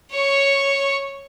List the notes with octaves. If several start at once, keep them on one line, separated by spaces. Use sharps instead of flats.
C#5 C#6